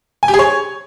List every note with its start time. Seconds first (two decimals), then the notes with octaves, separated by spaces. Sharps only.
0.23 G#5
0.28 G4
0.34 G#4
0.39 C#5